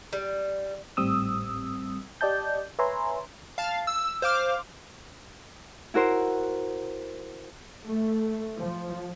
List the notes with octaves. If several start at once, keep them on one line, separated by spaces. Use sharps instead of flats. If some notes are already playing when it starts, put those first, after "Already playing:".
G3
G#1 A2 G3 C4 D#6 E6
G4 D5 D#5 A5 G6
B4 C#5 E5 G#5 A#5 C6
F5 A5
E6
C5 F5 D6 F6
E4 F#4 A#4 C5
A3
F3